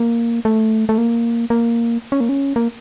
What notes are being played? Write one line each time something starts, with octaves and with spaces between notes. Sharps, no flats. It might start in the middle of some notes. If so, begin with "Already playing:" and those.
Already playing: A#3
A3
A3
A#3
A#3
C#4
A#3
C#4
A#3